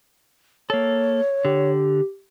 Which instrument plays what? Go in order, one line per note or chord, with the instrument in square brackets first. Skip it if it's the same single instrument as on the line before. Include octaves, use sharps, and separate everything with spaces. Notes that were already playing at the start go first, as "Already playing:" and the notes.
[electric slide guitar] A#3 A4 [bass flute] C#5
[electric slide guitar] D3 [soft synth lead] G4